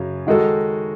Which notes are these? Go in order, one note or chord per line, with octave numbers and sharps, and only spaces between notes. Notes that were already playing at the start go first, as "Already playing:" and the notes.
Already playing: F#2 C#3 F#3
D#3 G#3 D#4 F#4 A4